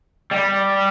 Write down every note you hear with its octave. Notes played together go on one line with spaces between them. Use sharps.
G3